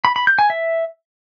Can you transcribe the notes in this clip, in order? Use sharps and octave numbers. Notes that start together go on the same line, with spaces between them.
B5
B5
G6
G#5
E5